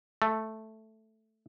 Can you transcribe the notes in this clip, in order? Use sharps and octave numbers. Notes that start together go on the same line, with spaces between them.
A3